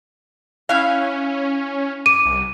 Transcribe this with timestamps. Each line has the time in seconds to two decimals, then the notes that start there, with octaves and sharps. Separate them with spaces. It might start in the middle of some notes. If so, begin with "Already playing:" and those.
0.69 C#4 E4 F5 F#6
2.06 D6 D#7
2.25 C2